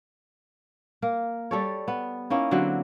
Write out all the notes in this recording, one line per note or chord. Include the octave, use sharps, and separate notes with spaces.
A#3 A#4
G3 A4 C#5
B3
A#3 C#4 D#4 E4
D3 F#3 C4 G4